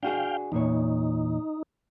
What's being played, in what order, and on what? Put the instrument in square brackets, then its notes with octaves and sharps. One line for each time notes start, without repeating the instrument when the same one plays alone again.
[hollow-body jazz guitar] D4 F#4 G#4 [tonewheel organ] F5 G5
[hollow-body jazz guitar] E2 A#2 C#5 [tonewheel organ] D#4